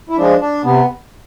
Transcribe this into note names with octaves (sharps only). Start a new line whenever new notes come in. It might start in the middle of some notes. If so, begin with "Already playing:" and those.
E4
F3 G#3 D4
D4
C3 B3